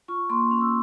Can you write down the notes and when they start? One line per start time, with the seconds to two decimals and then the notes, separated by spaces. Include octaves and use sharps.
0.08 F4 C#6
0.30 A#3 C6
0.51 C#4
0.61 E6